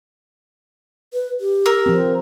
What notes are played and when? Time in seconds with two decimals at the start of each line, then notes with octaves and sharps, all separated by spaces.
1.13 B4
1.40 G4
1.66 A#4 E6
1.86 F3 C4